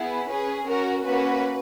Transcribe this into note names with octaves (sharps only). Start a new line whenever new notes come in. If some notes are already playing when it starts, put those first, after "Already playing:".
Already playing: B3 E4 G#4
C#4 G#4 B4
C#4 F#4 A#4
A#3 C#4 F#4 B4